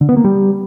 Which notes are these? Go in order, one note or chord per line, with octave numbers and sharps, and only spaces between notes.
D3
B3
A#3
G3